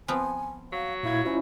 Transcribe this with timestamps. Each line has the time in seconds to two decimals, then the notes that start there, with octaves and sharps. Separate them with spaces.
0.08 F3 B3 C4 G#5
0.72 F#3 F5
1.03 A#2 E4 F5 G#6
1.25 C#4 E4 F4 C5